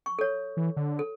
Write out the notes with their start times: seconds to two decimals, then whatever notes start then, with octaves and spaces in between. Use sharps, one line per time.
0.06 C#6
0.19 A4 C#5
0.57 E3
0.76 D3
0.99 A4